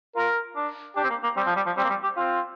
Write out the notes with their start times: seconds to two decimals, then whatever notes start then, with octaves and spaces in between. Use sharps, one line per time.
0.15 F4 A#4
0.56 D4
0.96 D4 G4
1.04 C4
1.10 A#3
1.23 A#3
1.36 G3 C4
1.46 F3
1.56 G3
1.66 F3
1.77 G3 C4
1.84 A#3
1.90 G3
2.03 G4
2.17 C4 F4